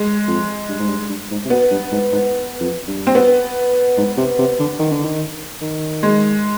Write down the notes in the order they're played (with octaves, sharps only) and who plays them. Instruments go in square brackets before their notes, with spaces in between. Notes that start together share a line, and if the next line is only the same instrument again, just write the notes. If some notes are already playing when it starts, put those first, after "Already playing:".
Already playing: [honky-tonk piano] G#3
[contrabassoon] F2
G2
G#2
G2
G2
G#2
C3
[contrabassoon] B2 [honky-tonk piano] B3
[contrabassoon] G2
G#2
G#2
F2
G2
[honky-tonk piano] C4
B3
[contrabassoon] G#2
C3
C3
D3
D#3
D3
D#3
D#3
[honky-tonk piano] G#3